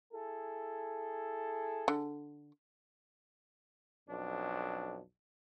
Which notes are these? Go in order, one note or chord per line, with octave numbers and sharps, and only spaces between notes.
E4 G#4 A4
D3
B1 F2 D4